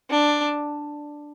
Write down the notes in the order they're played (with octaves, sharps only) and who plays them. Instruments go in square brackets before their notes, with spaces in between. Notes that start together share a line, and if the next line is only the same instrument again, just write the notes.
[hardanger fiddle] D4